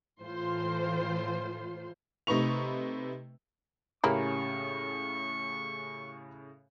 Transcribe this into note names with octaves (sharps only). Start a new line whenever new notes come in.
A2 E3 F4 C5 C6
C3 A3 D#4 B4 C#6 F7
A2 C#3 A#3 C#4 E4 G4 C#6